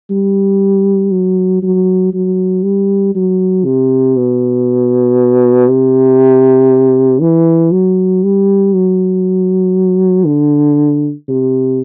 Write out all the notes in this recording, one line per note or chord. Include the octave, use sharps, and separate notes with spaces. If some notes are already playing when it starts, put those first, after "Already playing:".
G3
F#3
F#3
F#3
G3
F#3
C3
B2
C3
E3
F#3
G3
F#3
D3
C3